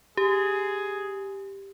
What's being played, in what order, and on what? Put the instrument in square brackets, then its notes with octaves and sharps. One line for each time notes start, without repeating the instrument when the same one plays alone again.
[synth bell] G4 [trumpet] G#4